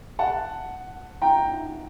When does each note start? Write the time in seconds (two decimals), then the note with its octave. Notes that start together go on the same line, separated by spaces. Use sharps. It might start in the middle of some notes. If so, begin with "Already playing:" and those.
0.19 F#5 A5
1.22 G5 A#5